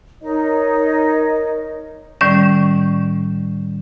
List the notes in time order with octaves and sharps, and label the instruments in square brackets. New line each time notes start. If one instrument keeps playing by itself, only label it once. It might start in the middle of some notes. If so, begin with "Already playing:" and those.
[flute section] D#4 A#4 C#5 D#5
[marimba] A2 D#3 G3 C#4 D5